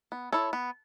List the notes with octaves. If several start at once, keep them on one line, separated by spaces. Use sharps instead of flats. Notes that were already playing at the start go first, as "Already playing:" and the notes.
B3
E4 A4 C#5
B3